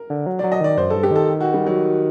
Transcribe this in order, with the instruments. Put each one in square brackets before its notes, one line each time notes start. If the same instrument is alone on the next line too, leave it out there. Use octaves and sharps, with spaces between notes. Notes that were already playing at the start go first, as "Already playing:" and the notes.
Already playing: [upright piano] A#4
[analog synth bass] D3
F#3
[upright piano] D5
[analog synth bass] F#3
[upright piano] D#5
[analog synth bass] D#3 [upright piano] D5
[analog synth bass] F#2 [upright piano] C5
[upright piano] A4
[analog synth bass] G2
[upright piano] G4
[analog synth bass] D#3 [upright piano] A4
[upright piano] F#4
G3
F#3